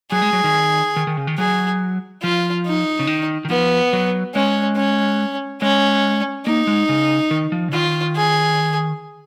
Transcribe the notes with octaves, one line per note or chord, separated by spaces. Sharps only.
F#3 G#4
G#3
F#3
D#3
D#3
D#3
C#3
D#3
F#3 G#4
F3 F4
D#4
C#3
D#3
D#3
F3 B3
F#3
G#3 C#4
C#4
G#3 C#4
A#3 D#4
G#3
C#3
D#3
F3
C#3
D#3 F4
G#4